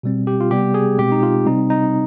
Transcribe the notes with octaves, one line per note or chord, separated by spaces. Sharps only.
B2 G3 C4
G4
F4
C3 G3 B3 G4
G#4
B2 G#3 C4 G4
D#4
F4
C3 G3 C4 D#4
D#4